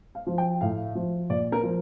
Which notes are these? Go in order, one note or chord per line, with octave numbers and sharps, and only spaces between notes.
F5
F3
G5
A2 F5
F3
A#2 D5
A#4
F3